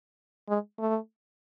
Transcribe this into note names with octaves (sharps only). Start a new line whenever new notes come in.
G#3
A3